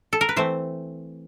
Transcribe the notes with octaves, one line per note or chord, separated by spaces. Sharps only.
A4
A#4
B4
E3 A3 C4 C5